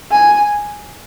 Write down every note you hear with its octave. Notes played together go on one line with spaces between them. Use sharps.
G#5